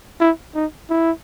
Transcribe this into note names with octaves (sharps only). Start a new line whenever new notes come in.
E4
D#4
E4